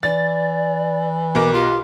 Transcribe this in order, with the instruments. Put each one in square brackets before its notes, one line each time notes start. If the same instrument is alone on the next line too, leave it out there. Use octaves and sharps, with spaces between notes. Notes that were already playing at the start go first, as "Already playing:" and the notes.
[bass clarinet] E3 [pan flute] D5 [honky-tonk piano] A6
[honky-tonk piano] B1 A#4 [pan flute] D6
[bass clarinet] F4 [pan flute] G4